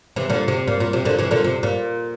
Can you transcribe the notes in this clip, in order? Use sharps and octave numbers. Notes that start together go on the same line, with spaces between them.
C3 E3
A#2 D3
C3
A#2
A#2
C3
A#2 D3
C3 E3
A#2 D3
C3
A#2